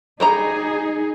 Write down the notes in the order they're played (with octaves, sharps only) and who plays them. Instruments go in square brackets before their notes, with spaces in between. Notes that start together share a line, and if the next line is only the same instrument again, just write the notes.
[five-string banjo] G3 F#4 A#5 [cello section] D#4 G#4